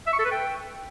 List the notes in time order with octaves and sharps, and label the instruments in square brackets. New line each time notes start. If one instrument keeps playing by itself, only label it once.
[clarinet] E5
C#6
A4
B4
G5